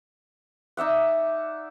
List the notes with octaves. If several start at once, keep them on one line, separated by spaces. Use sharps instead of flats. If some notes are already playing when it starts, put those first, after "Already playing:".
D#4 D5 E5 F#5